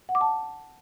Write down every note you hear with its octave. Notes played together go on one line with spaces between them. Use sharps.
F#5
D6
A5